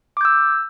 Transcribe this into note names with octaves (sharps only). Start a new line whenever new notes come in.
D6 E6 G6